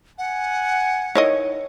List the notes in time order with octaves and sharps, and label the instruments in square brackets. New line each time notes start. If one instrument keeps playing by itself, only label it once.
[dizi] F#5 [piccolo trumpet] G#5
[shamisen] D#3 E4 D#5 [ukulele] C#5